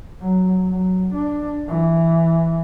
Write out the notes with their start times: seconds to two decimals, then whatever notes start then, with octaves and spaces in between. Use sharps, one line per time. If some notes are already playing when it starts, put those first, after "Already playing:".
0.21 F#3
0.68 F#3
1.13 D4
1.69 E3